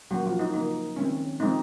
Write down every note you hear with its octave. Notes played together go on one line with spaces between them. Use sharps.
F3 F#3 A#3 C#4 F#4
F3 F4
D#4
C#3 F3 A#3 D#4
D#3 G#3 C4 C#4
F3 G#3 C4 D#4